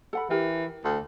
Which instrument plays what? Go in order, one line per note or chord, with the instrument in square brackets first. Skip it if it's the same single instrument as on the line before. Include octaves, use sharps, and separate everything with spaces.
[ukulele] A4 F#5 B5
[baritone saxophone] E3 [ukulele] G4 A#4
[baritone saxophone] D2